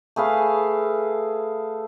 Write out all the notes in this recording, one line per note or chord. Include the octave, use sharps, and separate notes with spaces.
A3 G#4 B4 F5